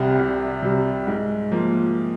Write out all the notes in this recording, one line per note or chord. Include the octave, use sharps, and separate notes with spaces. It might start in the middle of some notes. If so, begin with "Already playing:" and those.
Already playing: C2 C3 G3
C2
C3 G3
G#2
F3 A#3